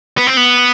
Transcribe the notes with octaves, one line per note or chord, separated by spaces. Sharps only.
B3
C4
B3